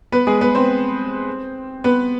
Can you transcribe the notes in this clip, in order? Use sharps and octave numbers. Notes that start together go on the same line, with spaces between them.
B3 B4
G#3 G#4
B3 B4
C4 C5
B3 B4